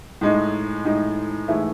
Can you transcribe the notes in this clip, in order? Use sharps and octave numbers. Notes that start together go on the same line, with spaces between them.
A2 G#3 D#4
A2 G#3 D#4
G#2 E3 A3 E4 G#4